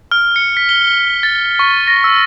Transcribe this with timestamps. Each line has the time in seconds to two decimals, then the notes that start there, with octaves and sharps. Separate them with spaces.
0.11 F6
0.36 C#7
0.57 B6
0.69 G7
1.23 A6
1.59 C#6
1.88 A#6
2.04 E6